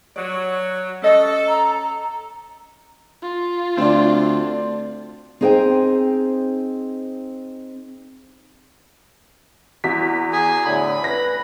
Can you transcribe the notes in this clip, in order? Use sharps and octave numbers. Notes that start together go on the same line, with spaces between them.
F#3 D5
C#4 A4 D#5
A#5
F4
D2 C4 D4
C4 D#4 G#4 C5 F#5 G5
E2 F#4 B6
G#4 G#5
A2 D3 B5
B4 A#6